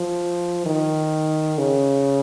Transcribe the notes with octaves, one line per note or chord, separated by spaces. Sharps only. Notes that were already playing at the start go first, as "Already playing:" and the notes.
Already playing: F3
D#3
C#3